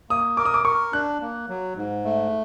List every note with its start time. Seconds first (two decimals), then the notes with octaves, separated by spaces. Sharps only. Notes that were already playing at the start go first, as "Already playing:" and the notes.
0.10 A#3 D#6
0.37 A#4 D6
0.45 D#6
0.54 D6
0.65 A#4 C#6
0.93 D4 F#6
1.21 A#3
1.49 F#3
1.76 G#2
2.04 A3